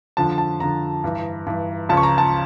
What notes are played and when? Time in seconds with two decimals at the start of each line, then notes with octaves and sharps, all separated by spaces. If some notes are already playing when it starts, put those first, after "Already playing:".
0.17 F2 D3 F3 A5
0.38 A5
0.60 F2 D3 F3 A#5
1.04 G2 E3
1.47 G2 E3
1.89 C#2 C#3 F3 A5
1.97 C#6
2.03 A#5
2.18 A5